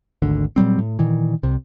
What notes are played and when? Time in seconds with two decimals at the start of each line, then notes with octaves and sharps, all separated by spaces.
0.22 G#1 D2 D3
0.56 A#2 F#3 G3 C4
0.79 A2
0.99 A#2 D#3 E3
1.43 C2 C3